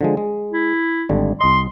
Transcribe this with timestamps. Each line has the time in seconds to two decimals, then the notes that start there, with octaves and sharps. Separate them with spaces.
0.01 D3 F3 G#3
0.17 G#3
0.51 E4
1.09 G#1 D3 G3
1.41 C2 D#5 C6